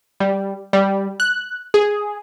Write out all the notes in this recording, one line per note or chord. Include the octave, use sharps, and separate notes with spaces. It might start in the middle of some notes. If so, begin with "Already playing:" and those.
G3
G3
F#6
G#4